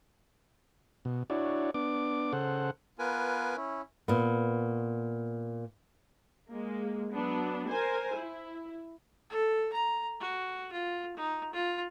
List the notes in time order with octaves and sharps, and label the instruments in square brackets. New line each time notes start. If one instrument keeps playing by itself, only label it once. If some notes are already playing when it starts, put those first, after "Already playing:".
[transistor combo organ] B2
D4 E4 F#4 C#5 D5
B3 D4 D6
C#3 A4 C5 F#5
[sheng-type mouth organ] B3 F4 [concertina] A#4 B4 G#5
[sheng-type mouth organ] C#4 E4
[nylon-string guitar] A#2 B3
[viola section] G#3 A#3
F#3 B3 D4
A#4 C5 G#5
E4
[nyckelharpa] A4
A#5
F#4
F4
D#4
F4